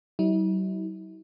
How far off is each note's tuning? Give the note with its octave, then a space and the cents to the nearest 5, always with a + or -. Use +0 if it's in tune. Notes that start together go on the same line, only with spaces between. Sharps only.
F#3 +45 E4 -45